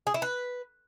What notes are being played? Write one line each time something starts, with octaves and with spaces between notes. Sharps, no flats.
G#4
E4
B4